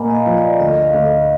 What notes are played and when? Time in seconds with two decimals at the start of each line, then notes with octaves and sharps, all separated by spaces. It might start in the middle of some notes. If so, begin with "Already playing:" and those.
Already playing: A#2 A#3 D#5 F#5 G#5 A#5 B5
0.10 D#5
0.15 F5
0.26 F3 B4
0.37 D5
0.59 D2 D#5
0.82 F5
0.94 D2
1.05 D#5